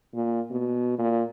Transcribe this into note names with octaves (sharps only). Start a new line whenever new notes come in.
A#2
B2
A#2